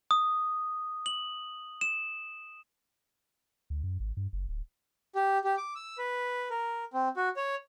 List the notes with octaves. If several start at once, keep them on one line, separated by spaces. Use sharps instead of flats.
D#6
F#7
E7
D2
F#2
G#1
G2
F#1
D1
G4
G4
D6
E6
B4
A#4
C4
F#4
C#5